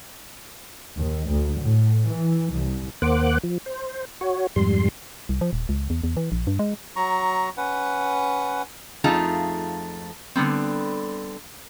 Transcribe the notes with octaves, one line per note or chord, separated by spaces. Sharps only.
D#2
D2
A2
E3
C2
D#2 A#3 C5 F#5 D6 F#6
F3
C5
F#4 C#5
F2 G#2 G3 C6
C2
F3
D#1
C#2
E2
E2
E3
A#1
G2
G#3
F#3 A#5 C#6
C#4 B4 F#5
F2 A3 D#4 F4 G#4 A5
D3 G3 B3 C4